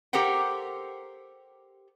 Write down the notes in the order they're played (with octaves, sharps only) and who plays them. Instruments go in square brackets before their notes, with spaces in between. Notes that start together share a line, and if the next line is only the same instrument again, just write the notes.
[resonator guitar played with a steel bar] G4 A4 A#4 C5 F#5 G5